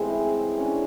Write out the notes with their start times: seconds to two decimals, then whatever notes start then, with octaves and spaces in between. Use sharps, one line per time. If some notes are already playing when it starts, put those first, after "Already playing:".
Already playing: A2 E3 G#3 C4
0.57 C#4
0.64 D4